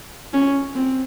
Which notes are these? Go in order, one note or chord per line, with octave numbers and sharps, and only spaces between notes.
C#4
C4